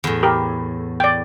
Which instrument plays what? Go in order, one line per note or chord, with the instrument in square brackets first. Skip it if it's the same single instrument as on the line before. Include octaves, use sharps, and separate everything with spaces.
[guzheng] E2 A2
[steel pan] G4 A#4
D5 G5